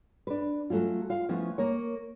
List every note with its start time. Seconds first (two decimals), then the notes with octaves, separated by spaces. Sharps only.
0.27 D4 B4
0.70 F#3 A3 C#4 F4
1.10 F4 F5
1.29 F3 A3 B3 C#4 E4
1.58 A#3 A#4 C#5